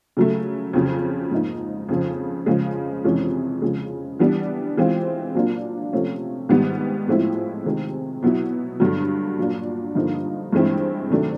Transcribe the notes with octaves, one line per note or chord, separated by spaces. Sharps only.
C#3 F#3 A3
F2 C#3 F#3
G#2 F3 A#3 D#4
F2 C#3 F3
C#3 F3 G#3
F2 C3 E3 G#3 C#4
C#3 F3 G#3
E3 G3 B3 D4
E3 G#3 C4 F4
A#2 F#3 A#3 D4 F4
C3 F3 A3 C#4
G#2 D#3 G3 B3
A2 F3 G#3 C4 E4
C3 D#3 G#3 C4
B2 F#3 B3 E4
G2 D3 F#3
A#2 F#3 A#3 D4
G2 D3 F3 A#3 D#4
G2 E3 G#3 C4 E4
C3 D#3 F#3 A3 D4